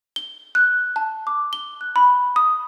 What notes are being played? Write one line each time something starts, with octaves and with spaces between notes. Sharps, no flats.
G7
F#6
A5
D6
G7
F#6
B5
D#6